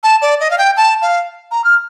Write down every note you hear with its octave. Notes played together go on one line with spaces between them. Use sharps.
A5
D5
D#5
F5
G5
A5
F5
A#5
F6